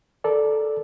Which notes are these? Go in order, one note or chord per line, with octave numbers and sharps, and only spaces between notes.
A4 A#4 D5